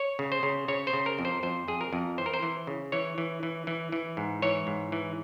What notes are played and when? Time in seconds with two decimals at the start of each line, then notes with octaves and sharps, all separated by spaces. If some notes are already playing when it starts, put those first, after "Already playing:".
Already playing: C#5
0.19 C#3
0.32 C5
0.43 C#3
0.68 C#3 C#5
0.87 C5
0.93 C#3
1.06 A#4
1.19 F2
1.25 C5
1.43 F2 C5
1.68 F2 G#4
1.81 A#4
1.93 F2
2.18 E3 C5
2.26 A#4
2.34 C5
2.43 E3
2.67 C#3
2.92 E3 C#5
3.18 E3
3.43 E3
3.67 E3
3.92 E3
4.17 G#2
4.42 E3 C#5
4.67 G#2
4.92 E3